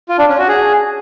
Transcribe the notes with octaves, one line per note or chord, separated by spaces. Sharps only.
F4
D4
C#4
F#4
G#4